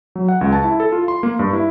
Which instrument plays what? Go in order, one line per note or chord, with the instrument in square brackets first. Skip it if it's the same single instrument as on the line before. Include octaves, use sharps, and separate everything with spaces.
[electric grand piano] F#3
F#5
C#2
A5
E4
A4
F4
C6
A#3
G2
E4